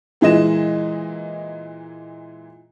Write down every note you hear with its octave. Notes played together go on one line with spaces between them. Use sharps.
A#2 E3 G#3 D#5 E7